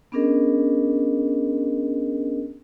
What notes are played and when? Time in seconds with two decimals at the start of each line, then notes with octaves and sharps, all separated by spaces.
0.12 B3 C#4 D4 G#4 A#4 D#5